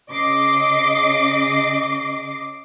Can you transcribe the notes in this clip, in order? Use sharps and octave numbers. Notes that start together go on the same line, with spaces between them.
C#3 D#5 D6 C7